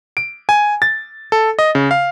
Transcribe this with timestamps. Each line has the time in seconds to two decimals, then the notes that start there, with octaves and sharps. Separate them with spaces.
0.17 D7
0.49 G#5
0.82 A6
1.32 A4
1.59 D#5
1.75 C#3
1.91 F5